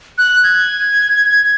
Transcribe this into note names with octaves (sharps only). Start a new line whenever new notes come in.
F#6
G#6